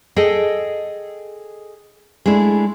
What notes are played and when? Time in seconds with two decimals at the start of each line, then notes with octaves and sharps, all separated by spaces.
0.16 G#4 A4 D#5 G5
2.26 G#3 A3 D4 E4